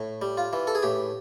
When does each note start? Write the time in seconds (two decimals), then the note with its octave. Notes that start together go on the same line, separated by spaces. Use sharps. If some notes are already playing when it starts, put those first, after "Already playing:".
Already playing: A2
0.22 G3
0.37 F4
0.53 E3
0.67 A4
0.75 G#4
0.83 A2 G4